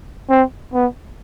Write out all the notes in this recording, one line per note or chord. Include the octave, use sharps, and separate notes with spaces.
C4
B3